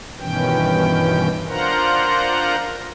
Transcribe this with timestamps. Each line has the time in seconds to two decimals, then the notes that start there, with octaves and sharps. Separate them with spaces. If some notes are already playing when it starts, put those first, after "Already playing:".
0.20 G2 B2 D#3 E3 C#4 G5
1.49 D4 F4 A#4 C5 F#5 A#5